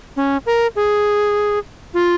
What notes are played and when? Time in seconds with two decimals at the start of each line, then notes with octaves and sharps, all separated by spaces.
0.17 C#4
0.46 A#4
0.76 G#4
1.94 F4